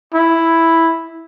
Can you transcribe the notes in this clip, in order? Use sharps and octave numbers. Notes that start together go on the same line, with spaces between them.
E4